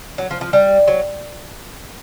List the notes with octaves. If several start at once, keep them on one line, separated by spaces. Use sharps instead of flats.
F#3
F3
F3
G3
F#3